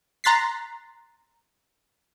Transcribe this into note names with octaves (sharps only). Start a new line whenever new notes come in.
A#5 C6 F#6 A6 B6 C7